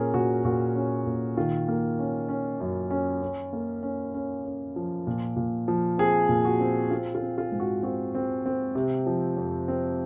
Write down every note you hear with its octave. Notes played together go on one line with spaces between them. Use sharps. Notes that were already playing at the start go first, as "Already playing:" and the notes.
Already playing: A#2 C#4 G#4 A#4
A#2 F#4
A#2 F#4
C#4
A#2
D#3 F4
A#3
C#4
C#4
F#2
C#4
C#4
A#3
C#4
C#4
C#4
F3
A#2
A#2
F3
C4 G#4
A#2
F#4
C4
C4 F4
F4
C4
F4
G#2
F#4
C4 F#4
C4
C4
C3
F3
F2
C4